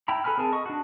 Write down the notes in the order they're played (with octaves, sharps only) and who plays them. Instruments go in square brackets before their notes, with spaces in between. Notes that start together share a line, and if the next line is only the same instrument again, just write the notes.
[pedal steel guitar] E4 G5 A#5 B5
A4 B4 G#5 B5 F6
C4 G#4 A#4 G#5 A5
D#5 C#6
D4 F#4